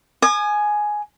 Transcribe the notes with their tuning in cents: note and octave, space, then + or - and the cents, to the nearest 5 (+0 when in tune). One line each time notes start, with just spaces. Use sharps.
G#5 +10 D#6 -40